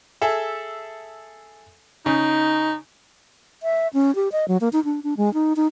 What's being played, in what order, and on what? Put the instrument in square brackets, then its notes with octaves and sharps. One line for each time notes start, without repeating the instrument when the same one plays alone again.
[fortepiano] G#4 A4 E5
[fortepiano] C#3 [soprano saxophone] D#4
[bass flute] E5
C#4
G4
D#5
F#3
A#3
D#4
D4
D4
G#3
D#4
D#4